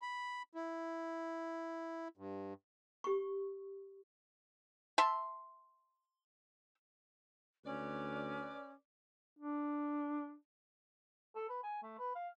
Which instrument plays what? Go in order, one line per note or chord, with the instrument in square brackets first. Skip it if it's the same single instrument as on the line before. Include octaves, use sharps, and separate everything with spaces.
[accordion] B5
E4
G2
[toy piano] G4 C#6
[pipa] E5 A5 C6
[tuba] D2 [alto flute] C#4 [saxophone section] B4 D5
[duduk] D4
[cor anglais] A4
B4
G#5
A3
B4
F5